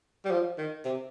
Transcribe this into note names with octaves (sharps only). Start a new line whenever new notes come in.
G3
F3
D#3
C3